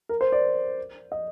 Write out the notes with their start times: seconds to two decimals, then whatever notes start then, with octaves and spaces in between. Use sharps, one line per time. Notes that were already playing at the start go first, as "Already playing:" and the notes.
0.09 A#4
0.21 C5
0.32 D5
1.12 D#5